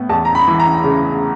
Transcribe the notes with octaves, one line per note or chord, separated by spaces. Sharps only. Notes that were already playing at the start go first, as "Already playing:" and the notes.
Already playing: A2 B3
E2 A5
A#5
B5
E3
A#5
C#3